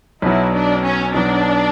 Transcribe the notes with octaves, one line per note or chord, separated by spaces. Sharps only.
B1 B2 F#3 E4
D4
C#4
B1 B2 F#3 D4